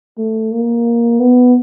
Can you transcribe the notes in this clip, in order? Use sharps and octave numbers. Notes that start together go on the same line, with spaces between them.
A3
A#3
B3